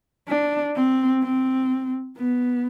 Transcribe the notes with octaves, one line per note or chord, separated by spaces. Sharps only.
D4
C4
C4
B3